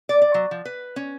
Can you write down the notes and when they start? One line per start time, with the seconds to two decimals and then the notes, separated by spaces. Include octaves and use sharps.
0.09 D5
0.22 D5
0.34 F#3
0.51 F3
0.65 B4
0.96 C#4